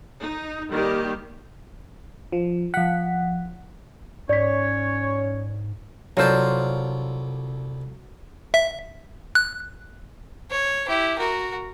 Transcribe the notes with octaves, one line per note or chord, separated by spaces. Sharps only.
D#4
D#3 G3 A#3 G4
F3
F3 F#5 B6
G#2 C#4 C#5 D5 B6
C2 F#3 F4 A4 C5 D5
E5
F#6
C#5
E4 G4
F#4 A#4